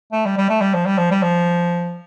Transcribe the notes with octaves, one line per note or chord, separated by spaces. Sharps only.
A3
G3
G3
A3
G3
F3
G3
F3
G3
F3